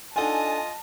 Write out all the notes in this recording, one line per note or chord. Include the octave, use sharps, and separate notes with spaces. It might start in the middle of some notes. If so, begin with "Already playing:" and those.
D4 D#4 F4 A4 D#5 F#5 G#5 A5